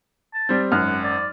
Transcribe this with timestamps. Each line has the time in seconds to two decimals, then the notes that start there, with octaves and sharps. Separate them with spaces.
0.34 A5
0.49 G3 C4
0.72 G#1 F#2 F#5 F6
1.03 D5